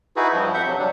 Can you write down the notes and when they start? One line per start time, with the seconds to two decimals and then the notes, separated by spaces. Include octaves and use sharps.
0.16 D#4 E4 F#4 G#4 B4
0.33 G2 F3
0.54 F2 E5 F#5 G6
0.66 C3 F#3
0.79 F#3 G3 D4